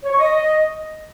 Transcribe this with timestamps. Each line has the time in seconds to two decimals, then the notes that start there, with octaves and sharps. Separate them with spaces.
0.04 C#5
0.12 C#6
0.20 D#5